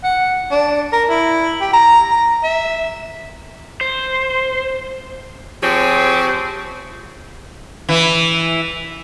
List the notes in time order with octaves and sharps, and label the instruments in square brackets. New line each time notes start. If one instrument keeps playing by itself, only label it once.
[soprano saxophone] F#5
D4
A#4
E4
G4
A#5
A#5
E5
[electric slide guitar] C5
[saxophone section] F3 C4 G4 G#4 C#5
[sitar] E3 E4